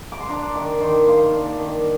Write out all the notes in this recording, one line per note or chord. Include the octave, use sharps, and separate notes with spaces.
D6
C6
D4 A#5
D#3 D6
D#3 C6
A#3 C6
D4
D6
D#3